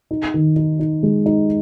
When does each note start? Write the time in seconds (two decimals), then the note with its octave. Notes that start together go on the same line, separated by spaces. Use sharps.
0.11 D#4
0.34 D#3
0.56 D#4
0.79 D#4
1.03 G#3
1.26 D#4